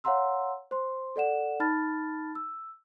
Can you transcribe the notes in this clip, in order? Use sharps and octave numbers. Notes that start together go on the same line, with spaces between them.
C#5 F5 F#5 A#5 C6 E6
C5 C6
A4 D5 F#5 E7
D#4 A5 B5 F6 A6
E6